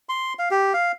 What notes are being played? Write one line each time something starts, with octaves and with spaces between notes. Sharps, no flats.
C6
F5
G4
F5